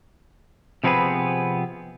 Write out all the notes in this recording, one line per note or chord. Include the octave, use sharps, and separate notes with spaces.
C3 F3 B3 C4 G#4 B4